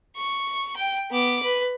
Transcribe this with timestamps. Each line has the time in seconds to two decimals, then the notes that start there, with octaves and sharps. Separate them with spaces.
0.17 C#6
0.77 G5
1.11 B3 D6
1.43 B4